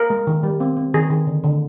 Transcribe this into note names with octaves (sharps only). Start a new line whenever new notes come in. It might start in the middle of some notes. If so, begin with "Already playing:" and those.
Already playing: A#4
G#3
D#3
G3
C4
C4
D#3 G#4
D#3
D3
D3